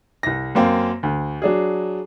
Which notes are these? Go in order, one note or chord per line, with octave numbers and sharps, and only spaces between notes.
C2 A#6
F#2 A#3 C4
D2
F#3 D4 G#4